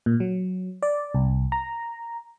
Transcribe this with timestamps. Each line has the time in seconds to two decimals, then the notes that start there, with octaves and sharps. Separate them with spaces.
0.06 A#2
0.20 F#3
0.82 D5
1.14 C2
1.52 A#5